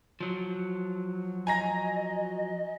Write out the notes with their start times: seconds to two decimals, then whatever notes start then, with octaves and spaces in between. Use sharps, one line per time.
0.20 F3 F#3
1.47 D#5 G#5 A#5 A#6